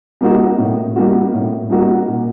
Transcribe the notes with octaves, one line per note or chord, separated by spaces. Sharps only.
G3 A#3 D#4 F#4
A2
G3 A#3 D#4 F#4
A2
G3 A#3 D#4 F#4
A#2